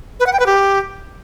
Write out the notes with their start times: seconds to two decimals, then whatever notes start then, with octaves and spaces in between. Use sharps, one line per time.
0.20 B4
0.26 F#5
0.33 G5
0.40 B4
0.46 G4